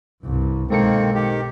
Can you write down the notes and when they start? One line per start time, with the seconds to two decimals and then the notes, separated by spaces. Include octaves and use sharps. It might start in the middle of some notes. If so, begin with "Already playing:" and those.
0.23 C2 G2
0.70 B1 D#3 G#3 A#3 C4 A4 C#7
1.15 D#3 G4